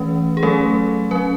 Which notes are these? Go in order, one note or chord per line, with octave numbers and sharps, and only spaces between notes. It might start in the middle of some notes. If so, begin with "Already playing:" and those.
Already playing: E3 A3 C#4 B4
G#4
F#3 A3 C#4 A4
F#3 C#4 B4